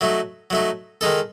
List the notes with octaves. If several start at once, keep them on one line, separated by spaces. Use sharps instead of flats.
F#3 A3 D#4
F#3 A3 D#4
D#3 G#3 D#4 A4